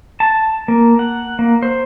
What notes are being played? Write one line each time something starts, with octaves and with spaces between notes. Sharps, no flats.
A5
A#3
F#5
A#3
C5